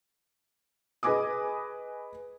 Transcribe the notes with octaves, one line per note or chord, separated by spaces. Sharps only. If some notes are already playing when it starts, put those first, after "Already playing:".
G#4 B4 D#5 G#5 D6 D#6